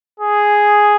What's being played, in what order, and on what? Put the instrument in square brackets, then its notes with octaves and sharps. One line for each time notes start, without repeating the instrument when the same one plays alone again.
[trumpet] G#4